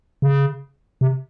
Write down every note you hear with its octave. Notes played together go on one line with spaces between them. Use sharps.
C#3
C3